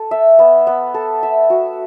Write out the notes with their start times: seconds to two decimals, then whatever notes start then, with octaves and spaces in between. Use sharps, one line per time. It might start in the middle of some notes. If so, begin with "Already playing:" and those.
Already playing: A4
0.11 E5
0.39 B3
0.67 B3
0.94 A4
1.23 E5
1.50 F#4